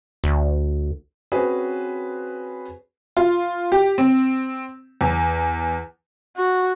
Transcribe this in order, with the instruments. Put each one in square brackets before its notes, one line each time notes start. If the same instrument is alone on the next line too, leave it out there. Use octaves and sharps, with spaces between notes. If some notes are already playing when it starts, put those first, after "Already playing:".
[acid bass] D2
[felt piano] C4 C#4 F#4 G#4 B4 C5
[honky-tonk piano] F4
G4
C4
E2
[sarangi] F#4